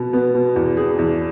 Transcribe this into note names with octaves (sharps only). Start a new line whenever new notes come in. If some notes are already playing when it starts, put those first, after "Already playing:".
Already playing: B2 B3
B3
B2
E2
G#4
E2